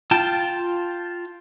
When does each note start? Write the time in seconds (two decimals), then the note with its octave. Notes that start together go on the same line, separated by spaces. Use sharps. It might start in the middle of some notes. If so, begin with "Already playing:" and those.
0.11 F4 G5 A5